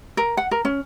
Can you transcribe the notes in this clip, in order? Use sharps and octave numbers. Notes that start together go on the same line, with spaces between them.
A#4
F#5
A#4
C#4